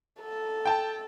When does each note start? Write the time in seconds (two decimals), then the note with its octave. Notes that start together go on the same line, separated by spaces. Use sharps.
0.21 A4
0.66 G5 A5